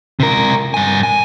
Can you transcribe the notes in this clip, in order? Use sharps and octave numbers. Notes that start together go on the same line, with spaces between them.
C3 A#4
G2 G#5
G#5